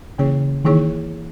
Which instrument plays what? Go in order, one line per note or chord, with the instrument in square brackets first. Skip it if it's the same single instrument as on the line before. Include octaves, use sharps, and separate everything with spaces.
[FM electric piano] C#3 [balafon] E3 A#3 E4 G#4 C#5
[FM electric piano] D#3 [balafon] E3 A#3 E4 G#4 C#5